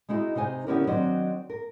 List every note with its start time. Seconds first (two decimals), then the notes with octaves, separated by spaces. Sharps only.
0.09 G#3 D#4 E4 F#4
0.35 C3 D#4 C5 G#5
0.67 D3 B3 C#4 E4 G4 A#4
0.87 D#3 F#3 C4 D4 D#5
1.50 A#4